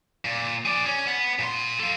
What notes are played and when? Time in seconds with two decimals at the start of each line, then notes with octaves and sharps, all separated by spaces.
0.25 A#2
0.65 G#4 D5
0.86 C#4
1.07 B3
1.39 A#2 C6
1.80 A4 F5